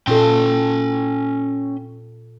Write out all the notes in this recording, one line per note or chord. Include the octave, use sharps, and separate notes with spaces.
A#2 C#4 F4 A4 G5